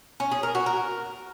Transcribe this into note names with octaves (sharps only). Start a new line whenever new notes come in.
C#4
G#4
A#4
F#4
A#4